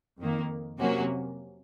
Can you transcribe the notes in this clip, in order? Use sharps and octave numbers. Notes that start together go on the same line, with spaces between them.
F2 D#3 A#3
C3 F#3 A#3 C#4 F#4